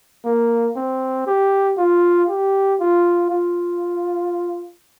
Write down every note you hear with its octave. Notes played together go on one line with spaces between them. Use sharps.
A#3
C4
G4
F4
G4
F4
F4